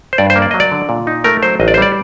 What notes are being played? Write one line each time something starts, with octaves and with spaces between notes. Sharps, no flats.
C5
G2 D5
C5
A#3
D5
F#3 D#5
D5
D3
A#2
D#4
A3 A#4
F#3 C5
A1 D#5
D5
C5
G3 D5